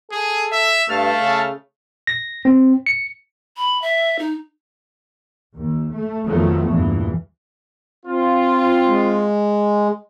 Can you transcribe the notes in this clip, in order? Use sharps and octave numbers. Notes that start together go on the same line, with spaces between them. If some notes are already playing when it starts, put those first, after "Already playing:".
G#4 A4
E5
G2 A3 F5 A5 F6
C#3
A#6
C4
C#7
B5
E5
D#4
D#2
A3
F2 D#3 F3 F#3 A3 B3
E2 G2 A#2 E3
C4 F4
G#3